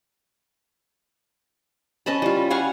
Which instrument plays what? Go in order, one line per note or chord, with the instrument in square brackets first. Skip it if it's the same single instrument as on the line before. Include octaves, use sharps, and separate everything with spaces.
[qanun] C#4 D#5 A5 B5
G3 F4
C#5 F5 F#5 G#5